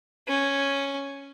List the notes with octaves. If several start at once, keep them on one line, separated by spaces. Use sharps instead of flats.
C#4